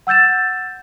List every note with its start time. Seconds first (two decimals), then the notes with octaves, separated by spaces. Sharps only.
0.07 F#5 E6 G6 A6 E7